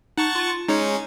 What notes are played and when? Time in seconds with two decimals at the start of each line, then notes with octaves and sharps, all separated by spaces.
0.18 D#4 F#5 A5 C#6
0.35 F4
0.69 G#3 C#4 D#4 C#5